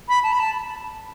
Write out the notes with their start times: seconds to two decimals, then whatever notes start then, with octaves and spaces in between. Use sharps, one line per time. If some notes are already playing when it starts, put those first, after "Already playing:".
0.09 B5
0.23 A5
0.33 B5
0.39 A5